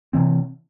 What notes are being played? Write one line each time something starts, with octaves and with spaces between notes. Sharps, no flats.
C3 E3 C4